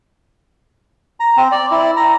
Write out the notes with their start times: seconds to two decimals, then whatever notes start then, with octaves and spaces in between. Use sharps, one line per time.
1.20 A#5
1.37 C4
1.52 D5
1.71 E4
1.97 A#5